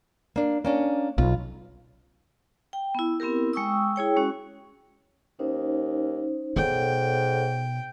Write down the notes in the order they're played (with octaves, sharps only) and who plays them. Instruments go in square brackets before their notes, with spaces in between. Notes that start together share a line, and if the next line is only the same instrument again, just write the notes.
[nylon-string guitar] A#3 D4
A#3 C#4 D4
[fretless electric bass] B1 [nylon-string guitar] F4
[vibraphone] G5
B3 E4
B3 C4 E4 G4 A#4
G#3 G5 C#6 D#6 E6
E4 G#4 C#5 G5
G#3 C#4 F#4
[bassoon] D#2 [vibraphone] C#4 D#4 C5
[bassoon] G#2 [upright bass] B2 [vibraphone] A4 C#5 F#5 [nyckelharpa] G5